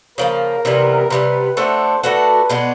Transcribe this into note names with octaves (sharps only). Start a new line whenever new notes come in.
C#3 F3 A#3 A#4
C3 E3 G3 B3
C3 E3 G3 B3 B4
A3 D4 F#4 A4 C5
A3 D4 F#4 A4 B4
B2 G#3 B3 D4